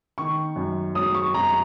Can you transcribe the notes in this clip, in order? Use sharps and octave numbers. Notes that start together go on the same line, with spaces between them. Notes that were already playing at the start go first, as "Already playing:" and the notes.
D#3 C#6
F#2
F#3 D#6
C#6
F#2 A#5